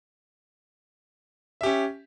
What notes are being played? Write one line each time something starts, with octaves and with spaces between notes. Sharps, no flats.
C#4 G4 E5